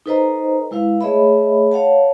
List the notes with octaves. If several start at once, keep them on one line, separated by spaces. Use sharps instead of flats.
D#4 A4 B4 C5 D#5 A#5
G#3 E4 B4 F5
A3 G#4 C#5 D#5 E5 B5
C#5 F5 F#5 A5